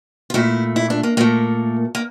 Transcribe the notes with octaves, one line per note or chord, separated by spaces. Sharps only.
F4
A#2 A3 E4
E4
D4
A#3
A#2 A3 A#3
A#3